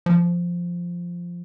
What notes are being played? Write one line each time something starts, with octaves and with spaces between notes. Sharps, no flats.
F3